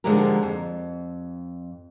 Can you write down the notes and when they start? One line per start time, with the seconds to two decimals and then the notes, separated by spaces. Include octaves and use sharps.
0.04 D3 F3 G#3 A#3 G4 A#4
0.43 F2